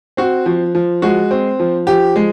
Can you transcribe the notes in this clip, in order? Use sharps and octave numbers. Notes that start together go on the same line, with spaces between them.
C4 F#4
F3
F3
G#3 F#4
C4
F3
F3 G4
G#3